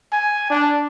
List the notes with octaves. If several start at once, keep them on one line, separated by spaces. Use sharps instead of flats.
G#5
D4